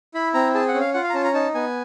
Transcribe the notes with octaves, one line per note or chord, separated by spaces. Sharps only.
E4 B5
C4 A#5
G#4 A5
F#5
C#4
F5
F4 F#5
F5
A#5
C#4 A5
A#5
D#4 A5
B3 G#5